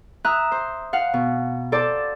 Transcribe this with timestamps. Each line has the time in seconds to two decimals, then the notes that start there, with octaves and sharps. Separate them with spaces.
0.25 E5 A#5 D#6 F#6
0.52 C5
0.93 F5 F#5
1.14 B2
1.72 A4 C5 D5 A5